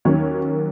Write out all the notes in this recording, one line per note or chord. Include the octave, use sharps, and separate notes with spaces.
D#2 D#3 F#3 A#3 C#4 C#5